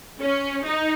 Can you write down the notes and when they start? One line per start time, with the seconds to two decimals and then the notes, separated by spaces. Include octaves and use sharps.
0.20 C#4
0.63 D#4